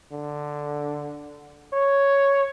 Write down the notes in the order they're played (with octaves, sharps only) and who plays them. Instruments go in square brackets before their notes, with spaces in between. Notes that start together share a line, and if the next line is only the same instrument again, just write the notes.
[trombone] D3
C#5